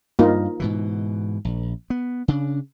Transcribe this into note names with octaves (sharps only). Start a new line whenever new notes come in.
G2 A#3 D#4 F4
G#2 B2 E3
A#1
B3
C#3 D4